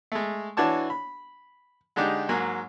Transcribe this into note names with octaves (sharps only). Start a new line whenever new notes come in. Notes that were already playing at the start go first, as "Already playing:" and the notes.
G#3 A3
E3 D4 F#4 C#5 A5 D6
B5
D3 G#3 D4 D#4 G4
G#2 F#3 A#3 G#5